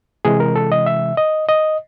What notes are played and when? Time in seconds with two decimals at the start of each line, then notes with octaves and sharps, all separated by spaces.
0.25 C3 E3 G#3 G#4
0.40 A#4
0.56 A4
0.72 D#5
0.86 E5
1.17 D#5
1.49 D#5